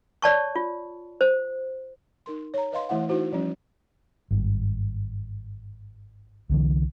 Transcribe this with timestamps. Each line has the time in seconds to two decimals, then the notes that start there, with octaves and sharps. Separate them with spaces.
0.22 C#5 D5 A5 C#6
0.56 F4
1.21 C5
2.26 D#4 A#4 C6
2.54 C#5 A#5
2.72 B4 D#5 F5 C6
2.89 E3 A3 E4 E5 F#5
3.09 D#4 E4 F#4 C5
3.33 F3 G3 C#4
4.31 G#1 G2
6.49 C2 D3 E3